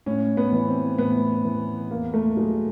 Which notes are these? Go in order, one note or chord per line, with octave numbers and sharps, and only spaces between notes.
A2 C#4
B3
E3
C4
A2 B3
E3
E2 A#3
A3
B2 F#3 G#3